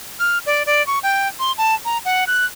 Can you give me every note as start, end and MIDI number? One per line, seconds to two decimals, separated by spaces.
0.20 0.38 89
0.46 0.63 74
0.66 0.85 74
0.87 0.99 85
1.03 1.28 79
1.39 1.52 84
1.58 1.75 81
1.85 1.98 82
2.05 2.24 78
2.27 2.45 90